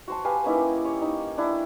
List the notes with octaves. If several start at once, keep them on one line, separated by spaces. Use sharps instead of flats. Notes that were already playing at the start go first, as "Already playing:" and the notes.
F#4 C5 A5
G4 B4 F5 G#5
A#3 C#4 D#4 E4
C#5
D#4
D4 E4